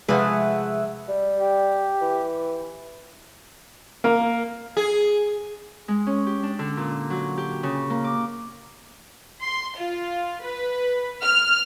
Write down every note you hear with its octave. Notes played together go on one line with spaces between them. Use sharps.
C3 F3 G#3 A3 G#4 B4 E5 F#5
G3
G4
E3
A#3
G#4
G#3
C#4
G4
D4
D3
A#2
F#3
G4
C#3
A#3
D6
C6
F4
B4
F6